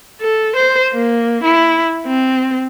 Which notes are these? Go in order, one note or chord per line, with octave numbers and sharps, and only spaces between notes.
A4
C5
A#3
E4
C4